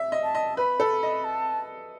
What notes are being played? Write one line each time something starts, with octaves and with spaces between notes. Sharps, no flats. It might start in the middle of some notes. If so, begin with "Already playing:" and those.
Already playing: E5
D#5
A5
D#5
B4 B5
A4
D#5
A5